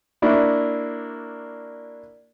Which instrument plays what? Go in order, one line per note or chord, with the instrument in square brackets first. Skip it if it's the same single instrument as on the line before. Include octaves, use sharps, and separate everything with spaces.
[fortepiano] A#3 D4 E4 F#4